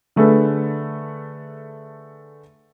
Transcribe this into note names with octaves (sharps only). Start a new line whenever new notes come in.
D3 A3 G#4 A4 B4